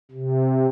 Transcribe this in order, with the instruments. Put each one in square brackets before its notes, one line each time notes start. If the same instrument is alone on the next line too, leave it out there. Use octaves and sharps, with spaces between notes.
[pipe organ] C3